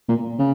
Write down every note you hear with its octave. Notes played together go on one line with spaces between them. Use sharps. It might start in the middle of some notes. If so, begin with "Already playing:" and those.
A#2
C#3